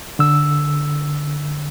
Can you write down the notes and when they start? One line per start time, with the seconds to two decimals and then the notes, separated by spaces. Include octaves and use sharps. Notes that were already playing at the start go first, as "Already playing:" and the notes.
0.19 D3 E6